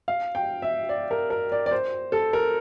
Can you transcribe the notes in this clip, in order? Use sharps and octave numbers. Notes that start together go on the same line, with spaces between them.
F5
G5
E5
D5
A#4
A#4
D5
D5
C5
A4
A#4